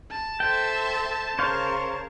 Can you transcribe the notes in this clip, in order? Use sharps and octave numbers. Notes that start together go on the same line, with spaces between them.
A5
A4 C5 E5 G5
C#3 A#4 C5 C#5 F5